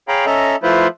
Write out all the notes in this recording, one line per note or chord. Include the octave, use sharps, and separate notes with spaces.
G#4 C#5 F5 G5 A#5 B5
C#4 A4 D#5 E5 A#5
F3 A3 E4 F4 B4 C5